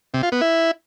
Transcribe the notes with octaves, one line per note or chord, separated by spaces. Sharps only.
C3
F4
B3
E4